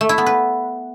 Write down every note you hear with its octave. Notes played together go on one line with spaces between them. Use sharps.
A3
E4
B3
B4